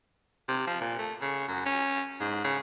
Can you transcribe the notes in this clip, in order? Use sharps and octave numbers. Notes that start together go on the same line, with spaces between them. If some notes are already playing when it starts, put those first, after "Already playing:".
C3
F3
A#2
A3
C#3
F#2
C#4
G#2
C#3